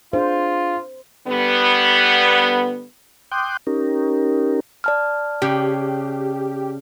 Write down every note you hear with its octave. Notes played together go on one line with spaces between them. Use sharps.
D4 F4 G#4 C5
D3 G3 B3
G5 C6 D6 D#6 F#6 G6
C#4 D#4 G4 A#4
D5 A5 F6
C#3 G4